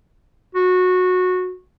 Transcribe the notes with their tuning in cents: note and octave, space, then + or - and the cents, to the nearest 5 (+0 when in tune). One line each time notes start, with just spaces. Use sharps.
F#4 -15